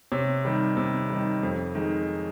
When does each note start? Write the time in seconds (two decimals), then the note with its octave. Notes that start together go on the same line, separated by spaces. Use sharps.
0.12 C3 C#5
0.45 D#3 G3
0.77 C3
1.10 D#3 G3
1.43 F2
1.75 D#3 G#3